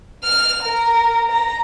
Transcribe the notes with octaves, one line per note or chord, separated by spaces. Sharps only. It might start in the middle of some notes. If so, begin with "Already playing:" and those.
F6 F7
A#4
A#5